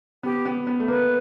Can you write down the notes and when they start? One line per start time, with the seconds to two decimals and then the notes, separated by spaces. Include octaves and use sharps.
0.23 B3 G4
0.45 B3
0.67 B3
0.80 A3
0.88 A#3 B4